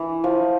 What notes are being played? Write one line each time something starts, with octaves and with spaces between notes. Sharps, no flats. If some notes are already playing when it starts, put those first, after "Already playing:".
Already playing: E3
F3